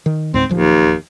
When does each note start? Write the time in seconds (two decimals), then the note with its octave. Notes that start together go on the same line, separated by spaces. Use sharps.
0.06 D#3
0.34 C#2 G#2 C4
0.49 D1 D#2 F3